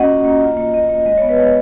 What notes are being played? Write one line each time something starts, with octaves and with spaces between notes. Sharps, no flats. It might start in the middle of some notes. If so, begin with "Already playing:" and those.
Already playing: A#3 C#4 F#4 D#5 F#5
F4
A#3
F4
A#3
A#3 D#5
A#3
G#3 D#5
B3 C#5
B4
G#3 C#5